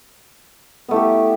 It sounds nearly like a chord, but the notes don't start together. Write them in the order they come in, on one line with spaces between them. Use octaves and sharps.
B3 A3 E4 G4